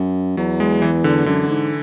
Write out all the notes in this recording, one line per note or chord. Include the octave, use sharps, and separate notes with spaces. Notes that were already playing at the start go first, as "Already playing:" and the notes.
Already playing: F#2
E2 F#3
G#3
E3
D3
F#2 D3
G#2